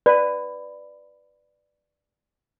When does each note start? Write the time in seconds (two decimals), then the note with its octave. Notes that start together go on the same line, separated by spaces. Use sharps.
0.06 B4 D5